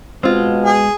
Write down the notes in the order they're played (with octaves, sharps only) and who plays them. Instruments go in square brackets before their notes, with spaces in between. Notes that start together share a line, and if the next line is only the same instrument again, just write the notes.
[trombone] B2 [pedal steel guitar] G#3 [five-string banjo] C4 F4
[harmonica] G#4